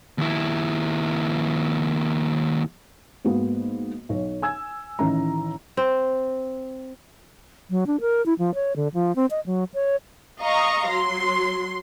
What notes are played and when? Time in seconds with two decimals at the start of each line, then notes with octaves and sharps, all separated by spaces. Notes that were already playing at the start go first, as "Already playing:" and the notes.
0.18 D#2 E4
3.25 G#2 A#3 B3 F#4
4.09 B1 C#5
4.42 G#5 E6 G#6
4.99 A1 D#3 C#4 E4 A#5
5.77 C4
7.70 F#3
7.87 D4
8.01 A#4
8.26 E4
8.39 F3
8.55 C#5
8.76 D3
8.94 F3
9.16 C4
9.31 D#5
9.46 F#3
9.74 C#5
10.41 D#5 F5 A#5 C#6
10.89 F#3 C6